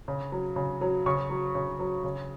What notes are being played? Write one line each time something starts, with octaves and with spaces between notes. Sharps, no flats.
C#3
F#3
C#3
F#3
C#3 C#6
F#3
C#3
F#3
C#3